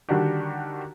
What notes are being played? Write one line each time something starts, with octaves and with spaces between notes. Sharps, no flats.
D3 D#3 G3 D4 F#4 G4